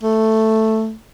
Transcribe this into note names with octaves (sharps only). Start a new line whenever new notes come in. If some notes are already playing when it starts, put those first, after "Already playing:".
A3